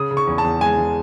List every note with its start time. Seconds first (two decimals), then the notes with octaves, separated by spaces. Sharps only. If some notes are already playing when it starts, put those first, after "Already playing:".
Already playing: C#3 D#6
0.11 C#3
0.17 C#6
0.27 E2
0.38 A5
0.44 E2
0.61 G#3 G#5
0.78 G#3